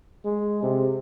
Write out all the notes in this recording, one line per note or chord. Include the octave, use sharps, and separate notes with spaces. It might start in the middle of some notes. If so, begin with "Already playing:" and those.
G#3
C3